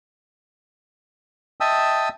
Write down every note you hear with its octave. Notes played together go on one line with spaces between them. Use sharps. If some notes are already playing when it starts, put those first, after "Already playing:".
D#5 E5 G5 A5 D#6 E6